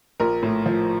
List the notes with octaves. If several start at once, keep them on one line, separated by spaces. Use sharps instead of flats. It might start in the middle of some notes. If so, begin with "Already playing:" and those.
A#1 A#4
A2
F3